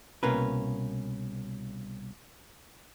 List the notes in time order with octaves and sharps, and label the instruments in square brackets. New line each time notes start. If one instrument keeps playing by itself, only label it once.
[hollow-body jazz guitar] C2 B2 A#3 C#4 A#4 B4